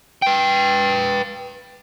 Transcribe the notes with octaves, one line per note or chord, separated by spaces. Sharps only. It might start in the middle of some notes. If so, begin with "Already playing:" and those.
B4 G5